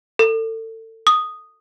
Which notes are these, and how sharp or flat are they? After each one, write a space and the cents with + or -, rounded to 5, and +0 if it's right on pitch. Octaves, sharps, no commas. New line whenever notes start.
A4 +30
D#6 -5